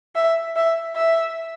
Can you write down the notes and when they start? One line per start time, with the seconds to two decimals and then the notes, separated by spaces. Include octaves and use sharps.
0.15 E5
0.56 E5
0.96 E5